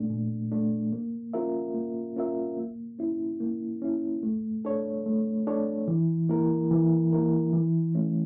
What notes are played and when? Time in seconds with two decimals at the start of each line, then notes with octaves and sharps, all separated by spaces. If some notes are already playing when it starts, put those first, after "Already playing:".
Already playing: A#2 A3 D4
0.10 A#2
0.52 A3 D4
0.93 A#3
1.33 C#4 F4 A#4 E5
1.74 A#3
2.16 C#4 F4 A#4 E5
2.57 A#3
2.99 C#4 E4
3.40 A#3
3.82 C#4 E4
4.23 A3
4.65 D4 A4 C#5
5.06 A3
5.47 D4 A4 C#5
5.88 E3
6.29 A#3 E4 A#4
6.71 E3
7.13 A#3 E4 A#4
7.53 E3
7.95 A3 C#4 E4